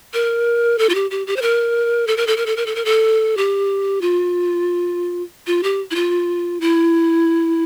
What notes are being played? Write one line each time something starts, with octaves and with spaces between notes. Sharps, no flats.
A#4
A4
F4
G4
G4
G4
C5
A#4
A4
A#4
A4
A#4
A4
A#4
A4
A#4
A4
G4
F4
F4
G4
E4
F4
E4